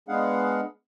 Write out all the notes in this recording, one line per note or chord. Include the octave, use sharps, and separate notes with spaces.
G#3 B3 D4 G#4 F5 F#5